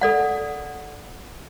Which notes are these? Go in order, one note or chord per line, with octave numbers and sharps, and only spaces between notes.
A4 D5 F#5